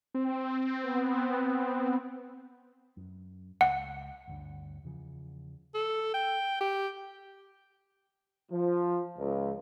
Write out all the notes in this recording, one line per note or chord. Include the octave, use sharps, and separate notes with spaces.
C4
B3
F#2
C#2 F#5
G1 D2 G2
E2 C#3 F3
A4
G5
G4
F3
C#2